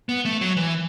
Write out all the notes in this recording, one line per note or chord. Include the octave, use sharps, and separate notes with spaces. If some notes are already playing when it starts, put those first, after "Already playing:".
B3
A3
F#3
E3